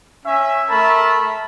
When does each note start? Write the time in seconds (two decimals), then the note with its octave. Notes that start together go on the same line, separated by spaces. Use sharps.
0.25 C#4 E5
0.70 A3 A#4 A5 B5